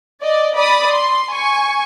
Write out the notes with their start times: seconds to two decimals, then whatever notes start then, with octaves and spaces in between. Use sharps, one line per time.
0.22 D5 D#5
0.55 D5 B5 D#6
0.92 C6
1.33 G#5 C#6